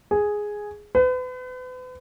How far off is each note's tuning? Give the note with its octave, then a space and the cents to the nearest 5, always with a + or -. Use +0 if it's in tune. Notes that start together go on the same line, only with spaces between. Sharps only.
G#4 +0
B4 +40